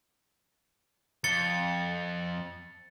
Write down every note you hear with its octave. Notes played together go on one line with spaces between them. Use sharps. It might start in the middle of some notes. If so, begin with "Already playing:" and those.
F2 A6 C#7 G7